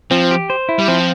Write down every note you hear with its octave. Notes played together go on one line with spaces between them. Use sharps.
F3 C4
G4
C5
E4
G3
F3 C4